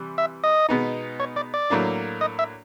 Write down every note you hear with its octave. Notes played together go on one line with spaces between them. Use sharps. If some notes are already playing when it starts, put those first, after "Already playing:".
Already playing: C3 E3 G3
E5
D#5
B2 G#3 B3 D#4
C#5
D5
D5
A2 F#3 A#3 D4
D#5
E5